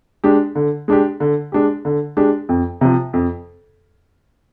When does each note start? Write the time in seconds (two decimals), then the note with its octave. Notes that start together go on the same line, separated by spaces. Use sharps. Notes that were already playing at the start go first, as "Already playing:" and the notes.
0.24 G#3 D4 G4
0.55 D3
0.88 G#3 D4 G4
1.20 D3
1.52 G#3 D4 G4
1.85 D3
2.17 G#3 D4 G4
2.49 F2
2.81 C3 F3
3.13 F2